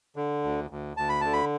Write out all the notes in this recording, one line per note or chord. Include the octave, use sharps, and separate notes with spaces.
D3
D2
D2
D2 A5
B5
D3 A5
B5